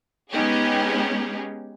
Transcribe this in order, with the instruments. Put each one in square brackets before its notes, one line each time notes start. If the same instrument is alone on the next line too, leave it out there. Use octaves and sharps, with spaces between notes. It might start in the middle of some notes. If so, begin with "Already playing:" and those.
[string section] G#3 B3 C#4 D#4 G4 G#4